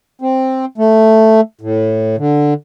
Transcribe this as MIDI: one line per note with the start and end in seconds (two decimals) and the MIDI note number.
0.22 0.65 60
0.78 1.41 57
1.61 2.16 45
2.18 2.54 50